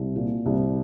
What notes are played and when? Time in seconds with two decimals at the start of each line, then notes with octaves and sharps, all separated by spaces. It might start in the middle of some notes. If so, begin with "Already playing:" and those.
Already playing: C2
0.16 A#2
0.46 C2